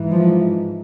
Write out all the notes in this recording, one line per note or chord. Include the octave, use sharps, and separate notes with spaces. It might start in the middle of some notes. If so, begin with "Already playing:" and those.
Already playing: G#2 E3
F3